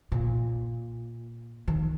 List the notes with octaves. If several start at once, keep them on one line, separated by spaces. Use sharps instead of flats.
A#2
D#3